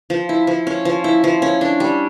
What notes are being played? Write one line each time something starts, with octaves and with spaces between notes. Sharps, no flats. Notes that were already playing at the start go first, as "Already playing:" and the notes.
F3
E4
F3
C#4
F3
E4
F3
C#4
D4
G3